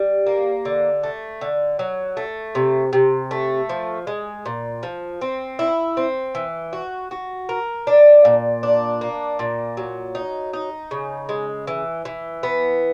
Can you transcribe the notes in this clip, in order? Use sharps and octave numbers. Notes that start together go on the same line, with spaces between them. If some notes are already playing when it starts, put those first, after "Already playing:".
Already playing: G3
A#3
D3
A3
D3
F#3
A3
C3
C3
A3
F3
G#3
A#2
F3
C4
E4
C4
E3
F#4
F#4
A#4
D4
A#2
D4
A#3
A#2
F#3
D#4
D#4
C#3
G#3
E3
E3
B3